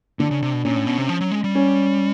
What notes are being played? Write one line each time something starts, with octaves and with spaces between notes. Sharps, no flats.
D3 D4
C#3
C3
B2
A#2 C#4
A2
B2
C3
F3
F#3
G#3
G3
C#4